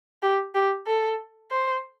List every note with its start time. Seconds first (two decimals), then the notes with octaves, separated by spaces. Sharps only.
0.22 G4
0.55 G4
0.87 A4
1.51 C5